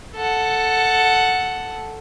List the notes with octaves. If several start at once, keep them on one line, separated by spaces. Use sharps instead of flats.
A4 F#5